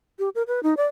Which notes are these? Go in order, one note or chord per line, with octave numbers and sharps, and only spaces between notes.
G4
A#4
B4
D#4
D5